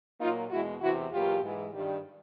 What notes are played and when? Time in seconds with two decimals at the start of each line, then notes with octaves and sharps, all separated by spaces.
0.20 A#2 F#3 A#3 D#4 F4
0.50 E2 B2 G#3 E4 F#4
0.81 E2 C3 E3 E4 F#4
1.12 E2 B2 F#3 A#3 F4 G4
1.42 G#2 E3 G#3
1.72 G2 D#3 G3